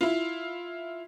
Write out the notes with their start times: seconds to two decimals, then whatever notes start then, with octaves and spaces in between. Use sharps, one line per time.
0.01 E4 F4